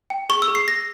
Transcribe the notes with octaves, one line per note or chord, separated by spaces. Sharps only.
G5
G#4 C#6
E6
G#4
C7
G#4 A#6